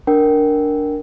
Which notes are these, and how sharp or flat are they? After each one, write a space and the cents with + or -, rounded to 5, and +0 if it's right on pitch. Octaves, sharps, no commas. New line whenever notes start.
D4 -5 A#4 +0 G5 -30